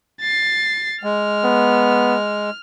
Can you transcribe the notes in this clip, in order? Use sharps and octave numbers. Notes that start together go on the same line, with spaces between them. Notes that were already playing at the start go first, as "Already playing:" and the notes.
A6 C7
G#3 F6
B3